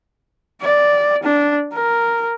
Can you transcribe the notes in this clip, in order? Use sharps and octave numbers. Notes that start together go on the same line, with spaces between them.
D5
D4
A#4